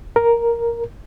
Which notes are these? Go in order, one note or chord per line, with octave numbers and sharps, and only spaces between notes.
A#4